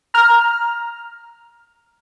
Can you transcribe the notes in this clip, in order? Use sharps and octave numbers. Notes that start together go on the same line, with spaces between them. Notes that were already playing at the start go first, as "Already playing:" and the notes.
A#5 F6